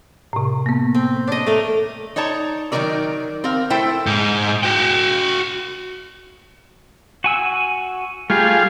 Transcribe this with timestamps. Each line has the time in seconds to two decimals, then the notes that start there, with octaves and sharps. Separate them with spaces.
0.33 A2 C3
0.66 A#3 B3
0.95 C4
1.27 D4 C#5 D#5
1.47 A3 A#4
2.16 D#4 C#5 D5 A5 A#5
2.72 D#3 F#3 A3 D#4 A#4 D5
3.44 C4 A#4 F5
3.70 A3 E4 A4 C5 E5 G5
4.07 G#2
4.63 F#4 G5
7.24 F#4 G#5 E6
8.30 G3 A3 F4 G#4 F5